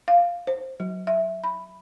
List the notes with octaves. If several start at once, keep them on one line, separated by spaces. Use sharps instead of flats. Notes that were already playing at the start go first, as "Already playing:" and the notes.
F5
C5
F#3
E5
B5